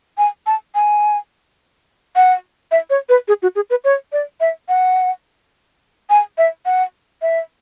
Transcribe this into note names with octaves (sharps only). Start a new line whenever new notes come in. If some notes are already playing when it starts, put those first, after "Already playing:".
G#5
A5
G#5
F#5
E5
C#5
B4
G#4
F#4
G#4
B4
C#5
D5
E5
F#5
G#5
E5
F#5
E5